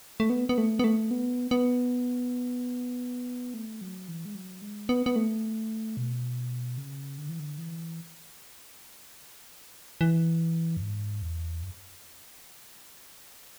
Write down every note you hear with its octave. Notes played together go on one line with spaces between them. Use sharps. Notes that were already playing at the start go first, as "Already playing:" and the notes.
A3
B3
B3
A3
B3
A3
B3
B3
A3
F#3
E3
G#3
F#3
G#3
B3
B3
A3
B2
C#3
D3
E3
D3
E3
E3
F#2
G#2
E2
F#2